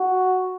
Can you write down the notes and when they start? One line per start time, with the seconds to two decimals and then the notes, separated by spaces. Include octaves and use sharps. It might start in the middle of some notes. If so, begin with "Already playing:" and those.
Already playing: F#4